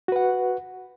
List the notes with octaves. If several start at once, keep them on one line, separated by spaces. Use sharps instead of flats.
F#4 B4 F#5